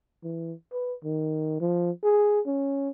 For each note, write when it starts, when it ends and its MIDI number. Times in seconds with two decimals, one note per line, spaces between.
0.24 0.53 52
0.73 0.94 71
1.04 1.60 51
1.61 1.91 53
2.03 2.40 68
2.46 2.90 61